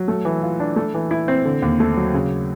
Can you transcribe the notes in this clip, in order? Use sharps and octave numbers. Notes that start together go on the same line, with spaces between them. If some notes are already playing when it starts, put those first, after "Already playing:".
Already playing: F#3
A3
E3
F4
D4
A3
E3
E4
C4
D3
D#2
A3
F#3
C#3